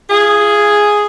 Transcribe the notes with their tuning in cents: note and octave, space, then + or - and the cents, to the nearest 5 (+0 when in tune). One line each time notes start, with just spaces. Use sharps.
F4 -30 G#4 +0